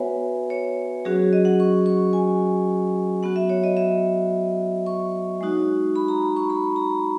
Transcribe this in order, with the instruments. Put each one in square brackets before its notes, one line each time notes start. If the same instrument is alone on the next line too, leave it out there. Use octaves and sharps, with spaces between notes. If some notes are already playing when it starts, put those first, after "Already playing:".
Already playing: [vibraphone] B3 F#4 B4 C#5 E5 F#5 G#5
C#5
F#3 C#4 F#4 G#4
D#5
F#5
C#6
C#6
G#5
F#3 B3 F#4 F#5
E5
C#5
D#5
E5
C#6
G#3 D#4 F#4
B5
A#5
B5
C#6
B5
A#5